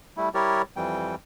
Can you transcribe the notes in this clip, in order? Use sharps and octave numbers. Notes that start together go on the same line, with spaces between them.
G3 A3 E4
G3 E4 G4 A#4 C#5 D5
F2 E3 G3 G5